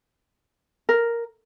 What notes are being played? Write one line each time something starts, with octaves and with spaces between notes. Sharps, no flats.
A#4